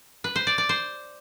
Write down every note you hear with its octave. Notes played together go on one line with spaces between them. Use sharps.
B4
C5
D5
D5
C5